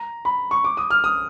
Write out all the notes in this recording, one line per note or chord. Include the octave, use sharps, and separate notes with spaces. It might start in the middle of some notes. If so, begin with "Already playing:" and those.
Already playing: A#5
B5
C#6
D6
D#6
F6
D#6